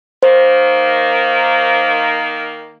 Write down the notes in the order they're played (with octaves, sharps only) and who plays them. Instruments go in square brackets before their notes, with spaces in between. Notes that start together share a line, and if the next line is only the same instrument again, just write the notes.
[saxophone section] D#3 A#3 [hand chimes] C5